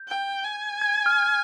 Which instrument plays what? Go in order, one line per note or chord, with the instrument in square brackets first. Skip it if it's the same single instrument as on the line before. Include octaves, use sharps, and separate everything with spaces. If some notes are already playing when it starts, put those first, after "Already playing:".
Already playing: [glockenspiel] G6
[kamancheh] G5
G#5
[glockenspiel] G#6
F6